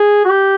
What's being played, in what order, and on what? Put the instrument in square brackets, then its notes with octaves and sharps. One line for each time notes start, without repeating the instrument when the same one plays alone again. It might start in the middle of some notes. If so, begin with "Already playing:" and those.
Already playing: [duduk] G#4
F#4
G4